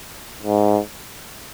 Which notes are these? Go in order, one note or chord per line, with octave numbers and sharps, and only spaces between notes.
G#2